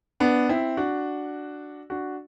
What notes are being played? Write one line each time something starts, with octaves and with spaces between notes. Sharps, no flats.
B3 D4
C4 E4
D4 F#4
D4 F#4